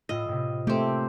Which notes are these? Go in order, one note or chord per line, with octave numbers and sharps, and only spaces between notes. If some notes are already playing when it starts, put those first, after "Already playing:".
A2 F4 D#5 E6
A2 C3
A3 A#3 C4 G4 C#5